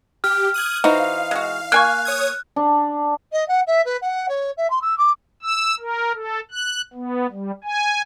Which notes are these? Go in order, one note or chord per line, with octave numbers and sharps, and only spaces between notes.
G4 F6
D#6 F#6 G#6
E3 D#4 F#4 C5 F5
G#3 F#4
A#3 G#5 C#6 F#6
C#5 D#6 G#6
D4
D#5
F#5
E5
B4
F#5
C#5
E5
C6
E6
D6
E6
A#4
A4
F#6
B3
G3
G#5